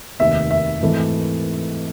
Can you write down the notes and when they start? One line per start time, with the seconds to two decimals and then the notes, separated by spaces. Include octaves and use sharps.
0.19 F1 D#2 D#3 E5
0.51 E5
0.81 G#1 G#2 E3 A3